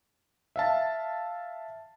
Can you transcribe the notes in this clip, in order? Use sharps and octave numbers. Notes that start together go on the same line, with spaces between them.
E5 F5 A5